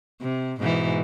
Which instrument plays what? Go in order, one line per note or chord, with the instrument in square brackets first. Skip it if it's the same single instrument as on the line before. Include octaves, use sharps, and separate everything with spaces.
[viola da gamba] C3
G#2 B2 E3